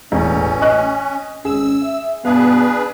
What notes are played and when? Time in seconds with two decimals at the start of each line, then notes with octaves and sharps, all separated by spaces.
0.12 E1 A1 C#4
0.62 D#5 C#6 F#6
1.45 G#1 C#4 G#4 E6
1.83 E5
2.25 G2 B2 B3 D4 G#4 B4 F5